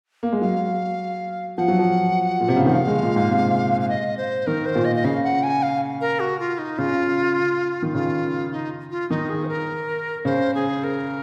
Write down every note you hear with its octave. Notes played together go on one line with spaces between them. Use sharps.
A#3
G#3
F#3 F5
F3 F#5
F#3
F3
A#2
C3
C#3
D#3 F#5
F3 F5
G#3
A#2
G#2
C3
F5
D#5
C5
D#3 A#4
C5
A#2
D#5
D#5
C#3 F5
F#5
G#5
F5
A#4
F#4
F4
D#4
C#3 F4
D#3
C#3 F4
D#4
F4
D#3 D#4
G#4
C5
A#4
C#3 C5
G#4
A#4